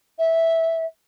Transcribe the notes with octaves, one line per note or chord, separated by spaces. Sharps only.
E5